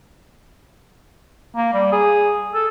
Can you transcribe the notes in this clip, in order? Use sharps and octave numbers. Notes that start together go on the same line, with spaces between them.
A#3
G3
G#4
A4